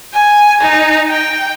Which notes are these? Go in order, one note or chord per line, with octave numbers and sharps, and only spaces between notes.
G#5
D#4
G5